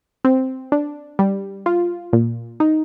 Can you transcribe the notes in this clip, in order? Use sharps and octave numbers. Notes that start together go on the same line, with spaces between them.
C4
D4
G3
F4
A#2
D#4